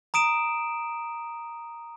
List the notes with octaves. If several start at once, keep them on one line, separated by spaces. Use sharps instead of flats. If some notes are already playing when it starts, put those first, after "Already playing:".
A#5 D#6 D7 E7